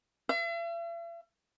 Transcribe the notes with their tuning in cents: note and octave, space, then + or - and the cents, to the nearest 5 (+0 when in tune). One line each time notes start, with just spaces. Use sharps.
E5 +45